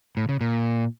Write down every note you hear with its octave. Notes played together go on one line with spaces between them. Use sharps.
A2
C#3
A#2